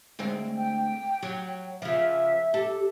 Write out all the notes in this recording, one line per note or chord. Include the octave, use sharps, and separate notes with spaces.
D2 G#3 C4
G5
F#3
C#3 F3 E5
G4 A4